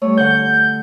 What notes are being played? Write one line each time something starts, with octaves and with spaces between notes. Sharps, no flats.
G3 A3 C#5
D3 F#5 G6